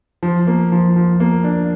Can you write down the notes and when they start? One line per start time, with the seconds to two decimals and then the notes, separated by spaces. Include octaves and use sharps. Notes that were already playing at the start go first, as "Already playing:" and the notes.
0.23 F3
0.47 A#3
0.72 F3
0.96 F3
1.20 A#3
1.44 D4